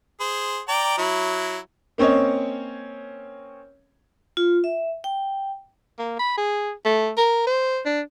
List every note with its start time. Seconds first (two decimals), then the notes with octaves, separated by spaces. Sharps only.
0.20 G#4 C5
0.68 D5 G5 A#5
0.98 F#3 E4
1.98 A#3 C4 C#4 C#5 D#5
4.37 F4
4.64 E5
5.04 G5
5.99 A#3
6.19 B5
6.37 G#4
6.85 A3
7.17 A#4
7.47 C5
7.85 D4